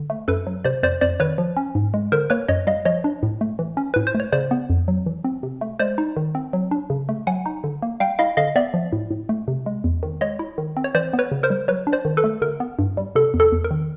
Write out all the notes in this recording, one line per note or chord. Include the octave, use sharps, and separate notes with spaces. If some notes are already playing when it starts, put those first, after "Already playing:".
Already playing: D3
A3
F#2 A4 B4
F#3
C3 C5 D5
F2 C5 D5
F2 C5 D5
D#3 B4 C#5
F3
C#4
G#2
G#3
D3 A#4 C5
A#3 B4 C#5
F#2 C#5 D#5
G3 D#5 F5
F3 C#5 D#5
D4
A2
A3
E3
C#4
A2 B4
C5
A3
C#5
C#3 C5 D5
B3
F2
F#3
E3
C4
C3
A3
G#3 C5 D5
D#4
D#3
C4
F#3
D4
C#3
A3
F#3 F#5 G#5
D#4
D3
A#3
G3 F5 G5
E4 D#5 F5
D3 D#5 F5
B3 D5 E5
F3
A2
A2
A3
C3
G#3
E2
D#3
G#3 C#5 D#5
E4
D#3
C4
C#5
E3 C5 D5
B3
B4 C#5
C#3
A#4 C5
G3
F#3 B4 C#5
D4
C5 D5
D#3
A4 B4
A3
D3 A#4
B3
G2
G3
C3 A4
E2
A4
E2
A#4
D#3